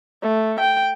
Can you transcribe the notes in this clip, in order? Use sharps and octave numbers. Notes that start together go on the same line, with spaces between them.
A3
G5